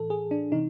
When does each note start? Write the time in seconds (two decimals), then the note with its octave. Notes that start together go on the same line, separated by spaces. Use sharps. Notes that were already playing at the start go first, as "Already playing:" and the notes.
Already playing: A2 E3 A4
0.10 G#4
0.31 D4
0.52 C3 E3 D#4